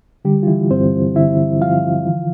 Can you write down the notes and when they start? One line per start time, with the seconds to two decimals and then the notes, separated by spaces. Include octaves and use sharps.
0.25 D3 G3 G4
0.43 F4
0.47 E3 E4
0.71 G2 C4 C5
1.15 D3 E4 E5
1.61 F3 F4 F5
2.07 E3